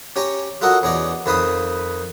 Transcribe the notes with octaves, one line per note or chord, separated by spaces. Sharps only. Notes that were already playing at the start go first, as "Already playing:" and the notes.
C#4 G4 C#5 G#5 A#5
F4 F#4 A4 A#4 D#5 F#5
E2 C#4 G#4 D5 D#5
F2 D#3 B4 F5 B5 D#6